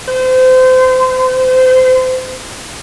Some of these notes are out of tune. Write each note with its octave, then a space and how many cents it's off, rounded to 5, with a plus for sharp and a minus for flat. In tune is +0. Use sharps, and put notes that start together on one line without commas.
C5 -30